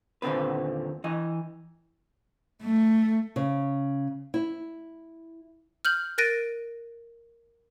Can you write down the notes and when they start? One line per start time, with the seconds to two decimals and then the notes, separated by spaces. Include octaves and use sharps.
0.22 D#2 A#2 D3 C4 B4
1.04 E3 D#5
2.63 A3
3.36 C#3
4.34 E4
5.85 F6 G6 F#7
6.18 A#4 F#6 A6 A#6 D7 D#7